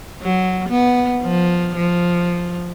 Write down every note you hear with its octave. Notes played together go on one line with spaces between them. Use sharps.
F#3
B3
F3
F3